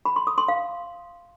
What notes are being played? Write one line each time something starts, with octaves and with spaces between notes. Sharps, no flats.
B5
C6
D#6
C6
F5